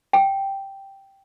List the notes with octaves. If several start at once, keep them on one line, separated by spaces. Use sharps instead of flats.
G5